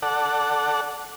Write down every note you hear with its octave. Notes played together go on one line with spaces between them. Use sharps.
A4 D5 F#5